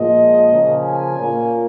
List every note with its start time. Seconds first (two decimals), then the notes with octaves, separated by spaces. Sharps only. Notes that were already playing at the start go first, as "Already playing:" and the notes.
Already playing: A#2 F3 G#3 D#5
0.51 C#3 F3 A#3 C#4
0.84 G#5
1.17 A#2 A#3 C#4